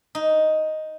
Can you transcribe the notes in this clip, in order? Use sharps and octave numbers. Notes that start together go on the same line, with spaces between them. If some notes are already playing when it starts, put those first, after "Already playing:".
D#4